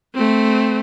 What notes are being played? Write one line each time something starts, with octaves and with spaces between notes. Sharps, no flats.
A3 C4